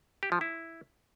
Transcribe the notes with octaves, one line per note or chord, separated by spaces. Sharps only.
G4
F3
E4